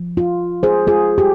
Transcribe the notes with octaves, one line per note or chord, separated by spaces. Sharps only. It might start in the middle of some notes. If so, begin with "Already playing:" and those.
Already playing: F3
F4
G#4 C5
F4 G#4
G4